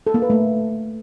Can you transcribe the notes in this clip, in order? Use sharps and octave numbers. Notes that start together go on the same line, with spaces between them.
A4
A#3
B4
A3